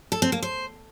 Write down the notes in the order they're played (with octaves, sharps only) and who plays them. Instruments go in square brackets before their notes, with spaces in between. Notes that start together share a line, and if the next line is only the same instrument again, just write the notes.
[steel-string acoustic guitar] A4
C4
A#3
C5